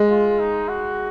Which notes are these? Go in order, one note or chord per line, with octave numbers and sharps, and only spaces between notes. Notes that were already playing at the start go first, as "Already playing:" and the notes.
Already playing: G#3
F4
D#4
F#4